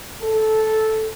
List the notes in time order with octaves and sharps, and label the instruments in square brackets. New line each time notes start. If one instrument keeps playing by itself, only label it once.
[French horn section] A4